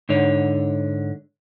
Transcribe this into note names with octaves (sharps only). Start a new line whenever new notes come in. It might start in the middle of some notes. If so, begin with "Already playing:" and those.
G#2 D3 C#5